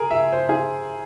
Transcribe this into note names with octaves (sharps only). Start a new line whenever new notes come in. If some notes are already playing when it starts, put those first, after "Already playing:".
Already playing: G#4 A#4
E5
C5
G#4